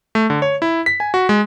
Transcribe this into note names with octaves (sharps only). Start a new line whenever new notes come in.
A3
D3
C#5
E4
B6
G#5
F#4
G#3